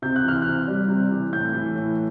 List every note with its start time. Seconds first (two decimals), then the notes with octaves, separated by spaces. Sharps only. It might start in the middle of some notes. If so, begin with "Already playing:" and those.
0.02 C3 G6
0.16 F#6
0.24 E3 F6
0.42 C3 F#6
0.68 G3
0.88 C3
1.11 E3
1.32 A2 G6
1.53 E3
1.76 A2